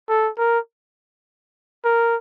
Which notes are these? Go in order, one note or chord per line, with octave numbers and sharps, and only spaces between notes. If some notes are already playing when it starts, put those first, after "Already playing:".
A4
A#4
A#4